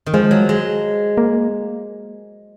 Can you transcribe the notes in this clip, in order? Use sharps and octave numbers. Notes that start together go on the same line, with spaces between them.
D#3
F3 G#3
F#3
G#3
A#3